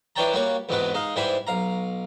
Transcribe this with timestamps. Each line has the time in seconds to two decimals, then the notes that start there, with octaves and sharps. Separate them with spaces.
0.16 E3 D4 C#5 G5 A5 A#5
0.33 G3 A#3 F#4 C#5
0.69 E2 G#2 C3 F#3 G#3 B4
0.94 G#3 D#4 F5
1.16 G#2 E3 G3 C5 G#5 B5
1.47 B1 F5 A#5